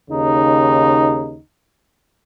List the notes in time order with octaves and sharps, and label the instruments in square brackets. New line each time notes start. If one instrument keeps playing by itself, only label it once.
[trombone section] D#2 C#3 D#4